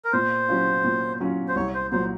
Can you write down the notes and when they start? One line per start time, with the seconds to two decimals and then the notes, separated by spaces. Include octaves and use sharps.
0.05 A#4
0.13 A#2 C5
0.48 F#3 C#4 F4
0.84 A#2
1.20 F#3 C#4 F4
1.48 C5
1.56 C2 C#5
1.74 C5
1.92 A#2 F#3 C5